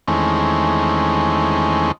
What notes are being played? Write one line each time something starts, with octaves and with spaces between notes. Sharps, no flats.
E2 D#3 G#3 A3 C4 C#4